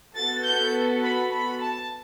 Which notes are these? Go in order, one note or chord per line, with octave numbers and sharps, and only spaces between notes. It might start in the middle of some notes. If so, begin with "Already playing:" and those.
B3 F#4 A4 A6
G6
B5
B5
A5